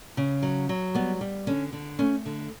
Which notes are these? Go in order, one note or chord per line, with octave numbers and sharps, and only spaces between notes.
C#3
F#3
F#3
G3 B3
G3
D3 C#4
D3
A3 C#4
D3